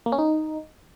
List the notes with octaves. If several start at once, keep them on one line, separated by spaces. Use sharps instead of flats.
A#3
C#4
D#4